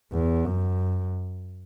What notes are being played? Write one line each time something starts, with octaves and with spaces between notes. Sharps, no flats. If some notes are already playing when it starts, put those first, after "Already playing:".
E2
F#2